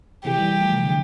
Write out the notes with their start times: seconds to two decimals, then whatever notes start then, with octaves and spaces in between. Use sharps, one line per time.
0.25 C3 E3 G4
0.37 E3 G3
0.60 F3 A3
0.72 C3
0.84 D3